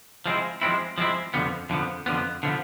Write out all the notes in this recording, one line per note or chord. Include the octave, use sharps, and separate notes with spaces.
F3 G#3 C4 E4
F3 G#3 C4 E4
F3 G#3 C4 E4
F2 D3 F3 B3
F2 D3 F3 B3
F2 D3 F3 B3
D3 F3 B3